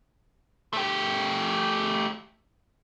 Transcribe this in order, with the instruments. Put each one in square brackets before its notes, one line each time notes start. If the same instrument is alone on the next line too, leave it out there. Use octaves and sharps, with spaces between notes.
[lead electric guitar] A3 G4